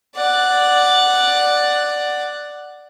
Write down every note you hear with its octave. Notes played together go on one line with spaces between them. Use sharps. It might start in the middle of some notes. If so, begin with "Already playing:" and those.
D5 F#5